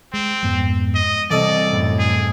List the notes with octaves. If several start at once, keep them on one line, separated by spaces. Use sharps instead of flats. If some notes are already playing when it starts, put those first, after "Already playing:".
G#3 C4
F2 G#2 B3
D#5
C2 C3 E3 A4 D5 D#5
F#2 A2
G#4